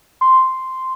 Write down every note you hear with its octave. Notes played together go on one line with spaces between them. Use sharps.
C6